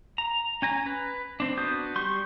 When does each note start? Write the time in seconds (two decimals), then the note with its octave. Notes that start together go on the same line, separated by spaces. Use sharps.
0.18 A#5
0.62 C#4 G#5 A#5
0.86 B4
1.40 C4 D4
1.57 B3 D4 F#4 D#6 G6
1.96 G3 C6 C#6 G6